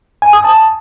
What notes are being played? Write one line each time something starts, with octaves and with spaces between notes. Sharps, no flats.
G#5
D#6
A5